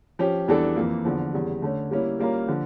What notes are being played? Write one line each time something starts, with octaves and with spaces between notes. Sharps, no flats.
F3 C#4 G4
E2 E3 G3 D4 A4
F2 E3 A#3
E2 D3 F3
E2 C#3 G3
D3 A3 C#4
G3 A#3 C#4 E4
G3 A#3 C#4 F4 A#4
D3 F3